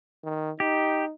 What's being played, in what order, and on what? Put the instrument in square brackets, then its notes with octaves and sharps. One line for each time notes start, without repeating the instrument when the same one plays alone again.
[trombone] D#3
[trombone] D#4 [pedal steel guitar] G4